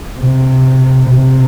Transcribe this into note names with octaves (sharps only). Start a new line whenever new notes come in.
C3
C3